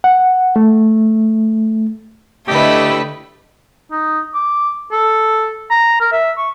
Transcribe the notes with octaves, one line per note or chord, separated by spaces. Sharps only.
F#5
A3
D3 A3 E4 G4 B4 D#5
D#4
D6
A4
A#5
A#4
E5
C#6